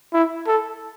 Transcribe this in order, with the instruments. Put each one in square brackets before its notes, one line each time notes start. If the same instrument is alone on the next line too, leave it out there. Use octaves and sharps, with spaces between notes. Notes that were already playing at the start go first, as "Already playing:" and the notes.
[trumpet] E4
A4